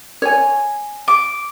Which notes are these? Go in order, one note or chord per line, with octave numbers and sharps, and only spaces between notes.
C#5 G#5
D6